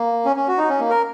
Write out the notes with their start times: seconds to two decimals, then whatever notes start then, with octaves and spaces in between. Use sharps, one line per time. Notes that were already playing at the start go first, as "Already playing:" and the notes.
Already playing: A#3
0.25 C#4
0.36 C#4
0.48 F#4
0.58 D#4
0.69 C#4
0.80 A#3
0.90 A#4